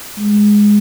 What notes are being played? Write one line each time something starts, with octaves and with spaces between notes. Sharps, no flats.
G#3